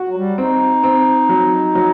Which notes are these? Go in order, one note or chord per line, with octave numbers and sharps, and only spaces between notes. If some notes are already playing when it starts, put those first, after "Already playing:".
Already playing: F#4
F#3
G3
C4 D#4
C4
F#3
F#3